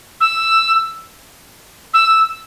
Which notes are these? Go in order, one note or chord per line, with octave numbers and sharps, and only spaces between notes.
E6
E6